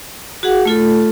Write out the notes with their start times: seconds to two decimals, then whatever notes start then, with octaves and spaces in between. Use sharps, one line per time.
0.43 F#4 G#4 F#5
0.65 A3 F4 A4